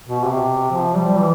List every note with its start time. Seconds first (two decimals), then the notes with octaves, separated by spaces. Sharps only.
0.08 B2
0.24 C3
0.72 F3
0.95 G3
1.20 E3